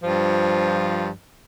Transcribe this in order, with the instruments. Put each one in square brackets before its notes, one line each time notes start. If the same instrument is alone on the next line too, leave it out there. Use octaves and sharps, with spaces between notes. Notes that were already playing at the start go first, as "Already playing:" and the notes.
[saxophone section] G2 F3